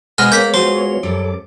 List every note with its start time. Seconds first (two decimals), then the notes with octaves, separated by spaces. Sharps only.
0.18 B2 G#3 B3 C5 F6 A#6
0.32 G#3 A#3 B3 C#5 G6 A#6 B6
0.54 F4 F#4 G#4 C5 C6
1.03 F#2 G3 A4 D6